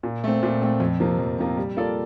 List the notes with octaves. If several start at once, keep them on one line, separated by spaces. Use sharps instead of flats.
A#2
A3 C4
A#2
A3 C4
F2
C3 F3 A#3
F2
C3 F3 A#3
G3
A#3 F4 A4 D5